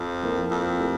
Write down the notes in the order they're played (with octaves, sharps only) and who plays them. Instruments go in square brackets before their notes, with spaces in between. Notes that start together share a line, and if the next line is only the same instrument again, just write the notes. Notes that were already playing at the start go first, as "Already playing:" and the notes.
Already playing: [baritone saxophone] F2
[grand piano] F3 A#3 E4 A#4
[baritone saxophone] F2
[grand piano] A3 E4 G4 A#4